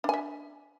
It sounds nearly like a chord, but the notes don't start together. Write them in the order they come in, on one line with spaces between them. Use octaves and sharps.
D4 G#5 E5